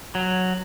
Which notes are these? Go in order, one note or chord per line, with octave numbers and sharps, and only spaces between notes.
F#3